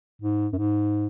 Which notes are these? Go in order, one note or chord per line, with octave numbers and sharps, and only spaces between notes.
G#2
F#2
G#2